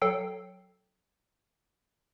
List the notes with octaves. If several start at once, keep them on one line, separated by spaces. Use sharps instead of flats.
F#3 A4 G5 C7